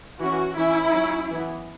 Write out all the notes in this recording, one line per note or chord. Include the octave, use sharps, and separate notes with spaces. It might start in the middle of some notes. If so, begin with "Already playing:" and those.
E3 C#4 F#4
E3 C#4 E4
F#3 C#4
E3 B3